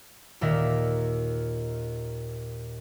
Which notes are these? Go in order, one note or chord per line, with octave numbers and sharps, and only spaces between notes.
D#2 A#2 D#3 A#4 E5